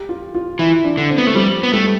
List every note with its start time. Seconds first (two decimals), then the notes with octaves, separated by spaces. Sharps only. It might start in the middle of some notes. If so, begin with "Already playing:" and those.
Already playing: G4
0.09 F4
0.35 F4
0.59 E3 E4
0.84 D4
0.97 D3
1.10 C4
1.18 B3
1.27 A3
1.35 F3 G3
1.63 B3
1.73 G3 A3